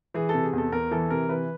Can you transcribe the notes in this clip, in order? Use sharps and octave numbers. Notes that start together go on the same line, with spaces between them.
E3 G#4
C3 A4
G#4
E2 A4
E2 A#4
E3 A4
C3 A#4
E3 B4